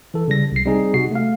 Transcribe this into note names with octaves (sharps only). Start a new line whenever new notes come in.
E3 A4
C#3 G3 A#6
C2 C7
G3 C4 D#4 G#4
C3 F#4 C7
A3 F5